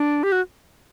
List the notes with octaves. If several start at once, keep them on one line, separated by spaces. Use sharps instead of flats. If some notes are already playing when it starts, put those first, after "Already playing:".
Already playing: D4
G4
F#4